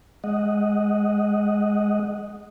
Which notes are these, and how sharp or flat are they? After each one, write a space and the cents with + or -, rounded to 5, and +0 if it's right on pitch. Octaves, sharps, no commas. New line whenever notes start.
G#3 +0 D#5 +0 F#5 +0